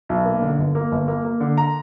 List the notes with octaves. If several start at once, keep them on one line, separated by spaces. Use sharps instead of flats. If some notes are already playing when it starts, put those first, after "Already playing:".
B1
A#3
D3
G1
A#3
G1
A#3
A#3
D3
A#5